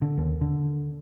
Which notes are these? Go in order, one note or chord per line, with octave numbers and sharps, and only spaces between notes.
D3
D#2
D3